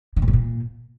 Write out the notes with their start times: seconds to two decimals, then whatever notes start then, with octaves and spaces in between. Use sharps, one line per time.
0.16 D3
0.22 A2
0.28 B2
0.33 A#2